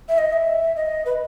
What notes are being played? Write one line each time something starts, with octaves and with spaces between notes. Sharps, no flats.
E5
D#5
E5
D#5
B4